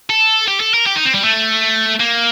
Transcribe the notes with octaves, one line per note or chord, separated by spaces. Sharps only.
A4
G4
A4
A#4
G4
D#4
C4
G3
A3
A#3